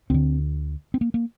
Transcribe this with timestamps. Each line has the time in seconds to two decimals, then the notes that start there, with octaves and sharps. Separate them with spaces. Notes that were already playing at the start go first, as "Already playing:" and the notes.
0.10 D2 D3 C4
0.94 C4
1.01 A#3
1.14 A#3